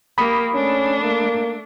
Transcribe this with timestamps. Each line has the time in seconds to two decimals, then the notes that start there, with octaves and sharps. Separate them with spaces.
0.18 A#3 G4 B5 D#6
0.54 A3 C#4 D4
1.02 A#3